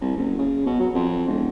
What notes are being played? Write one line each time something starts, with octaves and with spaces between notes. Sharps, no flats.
C2
F#1
C#3
B2
F#3
F2
E1